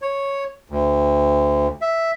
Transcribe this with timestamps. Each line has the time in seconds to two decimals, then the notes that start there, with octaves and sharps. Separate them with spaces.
0.02 C#5
0.70 D2
1.81 E5